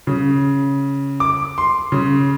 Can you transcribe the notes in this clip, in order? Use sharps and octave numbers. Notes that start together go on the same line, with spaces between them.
C#3
D6
C6
C#3